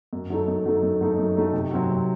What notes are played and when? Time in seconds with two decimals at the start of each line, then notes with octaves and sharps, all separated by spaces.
0.13 F#2
0.30 F#3 A3 D#4 A4
0.48 F#2
0.66 F#3 A3 D#4 A4
0.83 F#2
1.01 F#3 A3 D#4 A4
1.18 F#2
1.36 F#3 A3 D#4 A4
1.53 C3
1.71 F#3 C4 F#4
1.89 C3